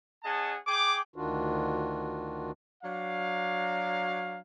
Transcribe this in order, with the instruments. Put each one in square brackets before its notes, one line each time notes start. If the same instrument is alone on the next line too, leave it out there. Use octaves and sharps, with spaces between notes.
[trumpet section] C#4 G#4 D#5 F#5 A5
G#4 G5 D6
[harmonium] D2 D#3 D4 F4 F#4
[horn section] F#3 D4 F5